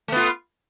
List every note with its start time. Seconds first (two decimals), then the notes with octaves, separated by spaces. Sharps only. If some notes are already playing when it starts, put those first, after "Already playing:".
0.08 A3
0.12 B3
0.16 F4